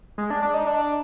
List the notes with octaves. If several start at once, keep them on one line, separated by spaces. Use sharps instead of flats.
G#3
D4
D4
D#4
D4